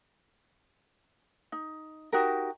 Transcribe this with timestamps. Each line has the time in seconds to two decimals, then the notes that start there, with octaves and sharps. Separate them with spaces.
1.52 D#4
2.12 D#4 F#4 G4 A#4